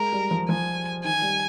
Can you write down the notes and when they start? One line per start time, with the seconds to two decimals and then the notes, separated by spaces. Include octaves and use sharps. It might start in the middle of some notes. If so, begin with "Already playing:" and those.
Already playing: G#3 A#4
0.13 G3
0.31 F3
0.49 F3 G#5
1.04 D#3 G#5
1.22 G3